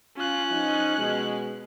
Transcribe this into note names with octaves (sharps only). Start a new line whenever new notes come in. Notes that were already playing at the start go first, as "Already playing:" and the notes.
C#4 F4 F#6
F3 D#4
B2 G#3